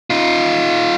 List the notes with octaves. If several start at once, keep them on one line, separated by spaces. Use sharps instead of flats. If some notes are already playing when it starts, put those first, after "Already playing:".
D#4 F4